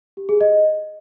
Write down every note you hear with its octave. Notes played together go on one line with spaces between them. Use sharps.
G4
G#4
D#5